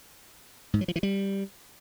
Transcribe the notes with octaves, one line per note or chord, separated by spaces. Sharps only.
G#2
F#3
F3
E3
G3